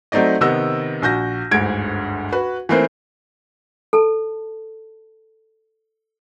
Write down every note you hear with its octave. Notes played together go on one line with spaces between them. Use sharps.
F#3 A3 C4 D#4 D5 D#5
C3 D#3 B3 D#5 E6 A#6
A#1 F#4 G6 A#6
G1 D2 G#2 G#6 D7
F#4 B4
E3 A3 A#3 C4 B4 C5
A4 A5